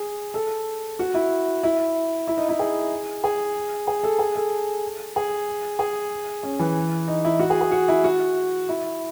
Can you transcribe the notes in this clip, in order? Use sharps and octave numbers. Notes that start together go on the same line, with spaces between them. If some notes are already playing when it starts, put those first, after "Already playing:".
Already playing: G#4
A4
F#4
E4
E4
E4
D#4
E4
G#4
G#4
G#4
A4
G#4
A4
G#4
G#4
C#4
E3
D#4
E4
F#4
G#4
G#4
F#4
E4
F#4
E4